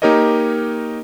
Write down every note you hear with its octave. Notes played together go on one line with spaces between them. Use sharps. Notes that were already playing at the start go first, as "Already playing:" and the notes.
A#3 D#4 G4 A#4 C#5 D#5